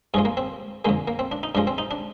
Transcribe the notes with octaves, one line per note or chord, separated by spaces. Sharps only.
G2 F3 G#3 G#4
A#3
C4
F2 D3 G#3 A#3
A#3
C4
D4
D#4
G2 F3 G#3 D4
C4
D#4
D4